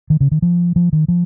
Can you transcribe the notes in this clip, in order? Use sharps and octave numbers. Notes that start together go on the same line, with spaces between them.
D#3
C#3
D#3
F3
F3
D#3
F3